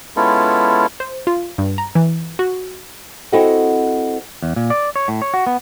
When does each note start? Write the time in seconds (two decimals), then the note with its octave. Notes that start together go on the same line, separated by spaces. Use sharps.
0.16 G#3 B3 C#4 E4 F4 A4
1.00 C5
1.27 F4
1.58 G2
1.78 A#5
1.95 E3
2.39 F#4
3.32 C4 E4 F#4 A4 D#5 F#5
4.42 E2
4.56 A#2
4.70 D5
4.96 C#5
5.08 A2
5.22 C#5
5.34 F#4
5.47 B3